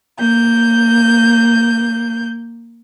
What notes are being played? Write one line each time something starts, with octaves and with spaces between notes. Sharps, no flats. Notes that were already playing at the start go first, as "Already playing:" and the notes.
A#3 G6